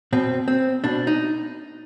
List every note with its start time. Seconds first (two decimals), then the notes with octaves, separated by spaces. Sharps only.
0.13 B2 C4
0.48 C4
0.84 B2 D4
1.07 D#4